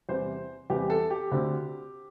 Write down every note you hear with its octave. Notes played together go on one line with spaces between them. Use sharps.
E2 C3 G3 C5
E2 C3 G3 G4
A4
G4
D2 D3 C4